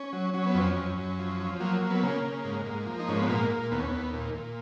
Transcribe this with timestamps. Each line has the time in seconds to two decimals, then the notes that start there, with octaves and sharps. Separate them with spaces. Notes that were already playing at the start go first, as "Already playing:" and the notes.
Already playing: C#4
0.13 F#3
0.34 F#3 C#4
0.46 B3
0.55 F2 C#4
0.77 F#2
0.98 F#2
1.19 F3
1.40 F3
1.60 F#3 A#3
1.82 F#3
1.90 B3
2.03 C#3 A#3
2.24 C#3
2.44 G#2
2.66 G#2
2.86 F3
2.99 D#4
3.08 G#2 C#4
3.19 B3
3.29 A#2 A#3
3.51 A#2
3.72 D#2 B3
3.79 C#4
3.88 D#2 B3
4.13 A#2
4.34 A#2